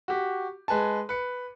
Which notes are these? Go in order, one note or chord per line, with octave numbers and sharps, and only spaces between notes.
F#4 G4
G#3 B4 G#5 A5
B4 C#7